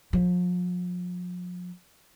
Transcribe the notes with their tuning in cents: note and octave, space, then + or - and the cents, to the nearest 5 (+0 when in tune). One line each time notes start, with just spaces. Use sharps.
F3 +40